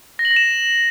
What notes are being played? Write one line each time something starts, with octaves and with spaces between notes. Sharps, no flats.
A#6
F#7
A#6
E7